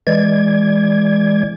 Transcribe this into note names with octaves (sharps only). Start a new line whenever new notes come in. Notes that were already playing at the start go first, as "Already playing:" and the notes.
E3 G#3 D5 G#6